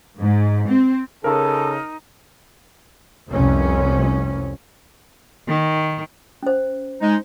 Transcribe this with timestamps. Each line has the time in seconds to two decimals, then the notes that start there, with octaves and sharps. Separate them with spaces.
0.20 G#2
0.68 C4
1.24 C#3 D#4 A4 A#4
3.31 F1 C2 F2 C3 C#4
5.48 D#3
6.43 C#4 C5
7.01 G#3 D#4